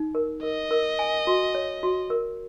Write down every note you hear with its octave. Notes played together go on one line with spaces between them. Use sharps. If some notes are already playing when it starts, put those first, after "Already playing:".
Already playing: D#4
A#4
A#4 D#5
A#4
G#5
F#4
C#5
F#4
A#4